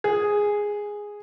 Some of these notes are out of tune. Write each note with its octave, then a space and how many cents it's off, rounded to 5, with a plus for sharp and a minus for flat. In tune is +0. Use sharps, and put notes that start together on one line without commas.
G#4 -5